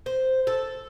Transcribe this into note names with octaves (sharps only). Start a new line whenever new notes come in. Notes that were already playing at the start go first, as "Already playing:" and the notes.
C5
A4